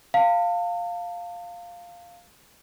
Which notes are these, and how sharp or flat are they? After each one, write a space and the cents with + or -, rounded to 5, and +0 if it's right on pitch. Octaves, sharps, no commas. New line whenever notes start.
F5 +0 A5 +40